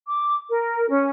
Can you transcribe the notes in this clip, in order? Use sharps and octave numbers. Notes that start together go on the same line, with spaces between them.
D6
A#4
C#4